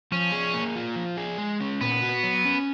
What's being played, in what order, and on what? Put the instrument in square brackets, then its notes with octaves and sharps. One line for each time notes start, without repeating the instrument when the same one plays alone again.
[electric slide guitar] F3 [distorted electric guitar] C#4
[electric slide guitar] G#4
A#3
F4
F3
G#4
G#3
C#4
[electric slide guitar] A#2 [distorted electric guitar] B3
[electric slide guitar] F#4
F#3
C#4